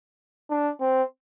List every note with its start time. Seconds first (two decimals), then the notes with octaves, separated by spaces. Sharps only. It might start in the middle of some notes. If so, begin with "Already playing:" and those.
0.50 D4
0.81 C4